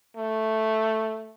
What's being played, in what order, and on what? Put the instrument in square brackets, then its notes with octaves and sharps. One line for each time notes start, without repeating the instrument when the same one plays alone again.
[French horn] A3